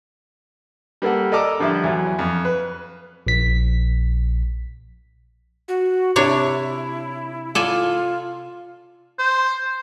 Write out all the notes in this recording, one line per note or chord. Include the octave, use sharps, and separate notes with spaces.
G3 A#3 A4 F#5
A4 D5 D#5 A#5 D6 E6
D3 F3 G3 E4
E2 F#3
F2
B4
A#1 B6
F#4
C3 D4 E4 C#5
F4 A4 D5 G#5
C5